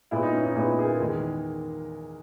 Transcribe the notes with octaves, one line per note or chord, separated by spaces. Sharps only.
A#2 G#3 B3 E4
D#4
C#4
D#4
A#2 G#3 B3 E4
D#4
G#4
A#4
E2 D#3 G#3